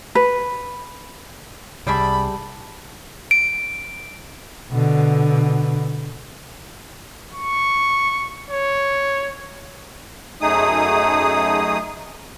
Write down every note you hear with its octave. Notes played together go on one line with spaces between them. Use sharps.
B4
C2 G3 G#4 E5 G5 A5 B5 D6
D7
B2 D3
C#6
C#5
F#2 A3 D#4 G#4 D#6